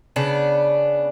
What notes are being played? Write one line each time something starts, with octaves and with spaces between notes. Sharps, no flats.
C#3 B3 D4